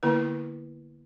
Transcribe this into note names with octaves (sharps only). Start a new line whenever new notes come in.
D3 A#3 B3 E4 B4